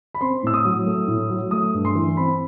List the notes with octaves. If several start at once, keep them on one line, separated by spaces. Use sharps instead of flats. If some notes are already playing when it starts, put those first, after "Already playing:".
B5
C4 C6
A2 E6
D#6
F#3
A3
A2
F#3
A3 D#6
G2
C6
E3
C4 B5